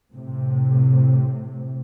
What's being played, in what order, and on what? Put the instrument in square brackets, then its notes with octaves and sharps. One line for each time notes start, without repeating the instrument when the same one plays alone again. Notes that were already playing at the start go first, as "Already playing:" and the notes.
[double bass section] A2 C3